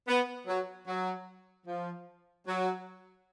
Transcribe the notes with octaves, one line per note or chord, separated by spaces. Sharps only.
B3
F#3
F#3
F3
F#3